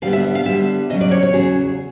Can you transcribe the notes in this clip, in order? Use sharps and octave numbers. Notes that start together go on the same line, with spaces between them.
D3 G3 B3 F5
E5
E5
F5
D3 G3 B3 E5
E2 C#3 F#3 D#5
D5
C#5
C#5
E2 C#3 F#3 G#4